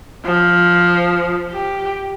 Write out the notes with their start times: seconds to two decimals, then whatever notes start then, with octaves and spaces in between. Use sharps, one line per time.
0.25 F3
1.50 G4